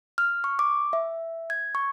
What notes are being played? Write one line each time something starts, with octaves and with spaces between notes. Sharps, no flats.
F6
C#6
D6
E5
G#6
C#6